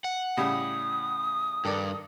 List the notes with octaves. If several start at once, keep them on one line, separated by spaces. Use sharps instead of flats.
F#5
A2 C#3 G3 D#6
G2 D#3 A4 D5